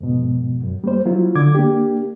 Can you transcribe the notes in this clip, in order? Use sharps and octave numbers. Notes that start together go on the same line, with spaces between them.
F2 G#2 B2
F#2
G3 A#3 C5
F#3 E4 F4
D3 D6 G#6
A#3 D4 G4